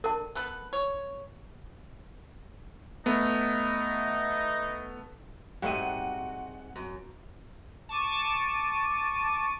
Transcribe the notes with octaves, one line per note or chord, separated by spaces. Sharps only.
D4 A#4 A5
B3 A4 B4
C#5
A3 B3 D#4
G#2 G3 A3 C4 F#4 F#5 D#7
F#2
A5 C#6 D6 D#7